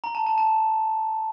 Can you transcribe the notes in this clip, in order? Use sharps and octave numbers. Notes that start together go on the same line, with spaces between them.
A#5
A5
A5
A5